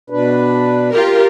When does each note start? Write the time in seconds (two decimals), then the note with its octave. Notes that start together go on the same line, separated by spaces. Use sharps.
0.10 B2 D4 B4
0.92 F4 G4 A#4